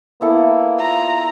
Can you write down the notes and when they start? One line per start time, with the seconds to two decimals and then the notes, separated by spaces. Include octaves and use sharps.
0.21 A#3 B3 E4 A4
0.79 F4 A#5